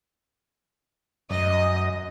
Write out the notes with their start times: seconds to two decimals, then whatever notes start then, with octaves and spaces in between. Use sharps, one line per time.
1.31 F#2 D#5